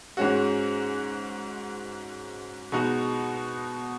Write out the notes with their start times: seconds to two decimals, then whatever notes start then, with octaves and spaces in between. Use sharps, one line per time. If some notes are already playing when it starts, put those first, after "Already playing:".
0.17 G#2 G#3 C#4 F#4
2.72 B2 G#3 D#4 F#4